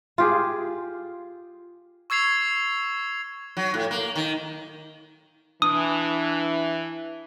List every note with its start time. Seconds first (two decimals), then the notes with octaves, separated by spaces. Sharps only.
0.18 F4 G4 G#4
2.10 C#6 E6 G#6 C7 F7
3.57 F#3
3.74 A2
3.91 A#3
4.15 D#3
5.62 E3 D4 D#6